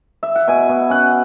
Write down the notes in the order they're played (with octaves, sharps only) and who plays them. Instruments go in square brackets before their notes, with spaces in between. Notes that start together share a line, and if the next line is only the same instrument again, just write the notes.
[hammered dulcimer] E5
F#5
B2 G#5
B2
C#4 F#5